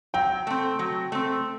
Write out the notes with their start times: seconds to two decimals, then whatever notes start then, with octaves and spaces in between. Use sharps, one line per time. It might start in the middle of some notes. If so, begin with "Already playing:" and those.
0.14 F#3 G5
0.47 A3 C4
0.79 F#3
1.12 A3 C4